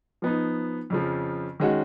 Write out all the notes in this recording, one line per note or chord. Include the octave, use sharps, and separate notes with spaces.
F3 B3 D#4
F2 C#3 F3
D#3 G#3 C#4 F#4